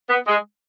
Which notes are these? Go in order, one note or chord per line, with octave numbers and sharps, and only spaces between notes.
B3
G#3